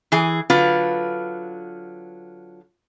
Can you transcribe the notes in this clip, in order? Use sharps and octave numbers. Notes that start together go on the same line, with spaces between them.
E3 G#4
D3 F#3 F4 B4